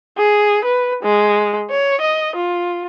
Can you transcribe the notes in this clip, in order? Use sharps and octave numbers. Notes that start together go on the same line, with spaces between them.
G#4
B4
G#3
C#5
D#5
F4